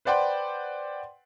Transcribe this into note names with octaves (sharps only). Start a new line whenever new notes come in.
B4 C5 D5 F#5 G5 C6